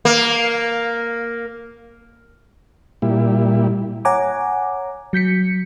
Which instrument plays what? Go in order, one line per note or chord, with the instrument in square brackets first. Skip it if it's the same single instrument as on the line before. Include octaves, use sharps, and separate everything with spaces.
[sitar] A#3
[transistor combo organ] A#2 G3 E4
[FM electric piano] C#5 F#5 G#5 A#5 D6
F#3 G6 B6 C#7